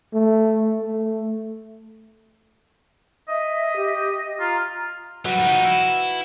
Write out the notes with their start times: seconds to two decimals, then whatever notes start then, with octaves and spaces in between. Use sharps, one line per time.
0.14 A3
0.80 A3
3.29 D#5 E5
3.76 G4
4.40 F4 A#5
5.25 F#3 G3 F#4 B4
5.40 F3 D#4
5.64 E4